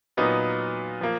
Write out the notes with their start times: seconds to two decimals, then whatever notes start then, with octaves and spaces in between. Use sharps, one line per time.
0.17 A#2 F#3 B3 D#4
1.01 F3 A#3